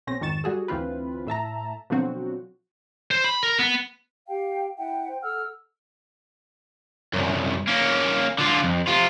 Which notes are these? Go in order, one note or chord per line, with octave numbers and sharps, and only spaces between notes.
B1 C4 C#4 A#6
G#1 F2 D#3 C#6 A6 E7
G3 F#4 G#4 A4
D2 E3 C4 F4 B4
A2 E5 A5 A#5
B2 D3 F3 F#3 C4 F#4
C5
B5
A#4
B3
G4 F5 G5
E4 E5 F#5 G5
C5 G5
A4 F#5 E6 F6
C2 F#2
A#3 C#4
D3 F4
F2
C3 F4